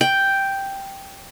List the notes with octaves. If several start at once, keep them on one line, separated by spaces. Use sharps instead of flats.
G5